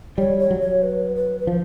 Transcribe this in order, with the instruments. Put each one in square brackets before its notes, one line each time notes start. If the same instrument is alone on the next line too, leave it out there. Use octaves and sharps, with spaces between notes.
[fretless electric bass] G3 [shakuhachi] C#5
[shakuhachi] C#5
[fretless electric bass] F#3
[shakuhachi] C#5
B4
B4
B4
[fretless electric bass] F3 [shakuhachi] C5